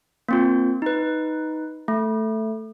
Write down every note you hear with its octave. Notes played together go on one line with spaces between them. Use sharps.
A#3 C4 F4
D#4 B4
A3